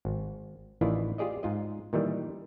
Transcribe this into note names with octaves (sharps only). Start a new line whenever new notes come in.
G#1
A1 D#3 E3 E4 F4 D5
F4 G4 G#4 D5 D#5
G#2 F4 D#5
A#2 D#3 E3 G3